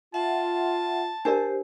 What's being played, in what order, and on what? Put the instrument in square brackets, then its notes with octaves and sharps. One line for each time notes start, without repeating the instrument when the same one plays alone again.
[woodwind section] F4 [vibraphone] E5 F#5 [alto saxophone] A5
[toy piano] D4 A#4 D5 [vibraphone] G4 C5